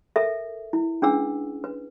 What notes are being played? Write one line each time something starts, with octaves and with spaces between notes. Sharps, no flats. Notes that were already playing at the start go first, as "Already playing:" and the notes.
A4 A#4 E5
E4
C#4 D4 G#4 B4 F#5 E6
B4